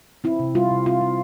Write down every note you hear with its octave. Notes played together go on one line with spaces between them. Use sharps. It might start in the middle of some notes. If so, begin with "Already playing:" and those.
C4 E4
C3
G3 F4
C3
C4 F4
C4